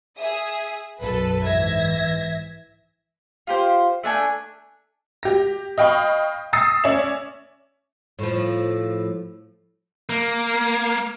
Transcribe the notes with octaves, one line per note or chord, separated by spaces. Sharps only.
G#4 E5 D#6
B1 F#2 A4 B4
G#2 E3 E5 G#6 A#6
F4 G4 C5
A3 D4 G#5
G4 A#6
D#5 F5 G5 B5 C#6
D#6 E6 A6 A#6 C7
C#4 D5 E5 E7
A2 F3
A#3